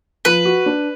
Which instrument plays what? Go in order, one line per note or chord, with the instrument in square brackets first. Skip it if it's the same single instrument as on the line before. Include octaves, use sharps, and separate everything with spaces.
[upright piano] F3 [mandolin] B4
[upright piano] F#4
D4